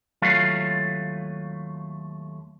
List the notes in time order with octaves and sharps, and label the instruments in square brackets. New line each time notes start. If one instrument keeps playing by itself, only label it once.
[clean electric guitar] D#2 F#3 A3 F4 F5